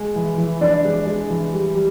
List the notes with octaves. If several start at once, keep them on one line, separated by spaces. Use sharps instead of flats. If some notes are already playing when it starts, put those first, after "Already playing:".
Already playing: G#3
E3
E3
E3 D4 D5
G#3
G#3
E3
G3
G3